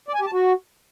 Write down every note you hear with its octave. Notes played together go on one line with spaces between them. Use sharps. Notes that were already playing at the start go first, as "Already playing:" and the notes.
D5
G#5
G4
A5
F#4